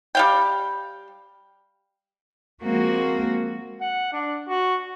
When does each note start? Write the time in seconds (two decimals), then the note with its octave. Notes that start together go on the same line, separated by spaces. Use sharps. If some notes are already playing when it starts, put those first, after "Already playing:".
0.15 G3 F5 G5
2.63 F3 G#3 A#3 C4 F#4
3.81 F#5
4.13 D4
4.49 F#4